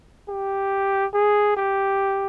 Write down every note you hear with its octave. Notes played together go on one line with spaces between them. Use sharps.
G4
G#4
G4